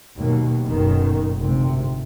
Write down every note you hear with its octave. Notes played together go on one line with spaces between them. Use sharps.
D#2 B2 F#3 A#3
F#1 B1 F#2 B2 D#3
G#1 D2 C3